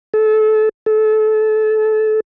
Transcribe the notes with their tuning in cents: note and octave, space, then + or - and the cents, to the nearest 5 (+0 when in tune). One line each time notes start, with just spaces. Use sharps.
A4 -25
A4 -25